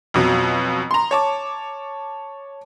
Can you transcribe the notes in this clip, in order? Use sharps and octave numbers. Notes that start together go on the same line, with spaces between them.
F2 B2 F#3
A#5 C6
C#5 A5 D6